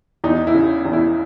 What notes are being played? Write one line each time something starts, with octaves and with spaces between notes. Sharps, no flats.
E2 D#4
E4
C#3
E2
E4